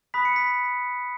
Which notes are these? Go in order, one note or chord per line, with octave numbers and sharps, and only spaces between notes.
B5 D#6 F#6 B6
C#7
B6